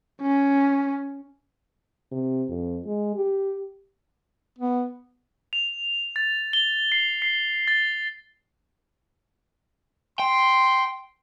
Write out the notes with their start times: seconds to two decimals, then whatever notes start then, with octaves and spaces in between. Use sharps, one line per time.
0.22 C#4
2.11 C3
2.49 F2
2.85 G#3
3.16 G4
4.58 B3
5.53 F7
6.16 A6
6.53 G7
6.92 C7
7.22 C7
7.68 A6
10.19 G5 C6